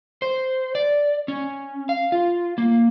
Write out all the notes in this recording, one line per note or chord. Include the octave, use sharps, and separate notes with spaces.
C5
D5
C#4
F5
F4
A#3